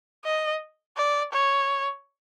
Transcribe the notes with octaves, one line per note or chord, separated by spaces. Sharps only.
D#5
D5
C#5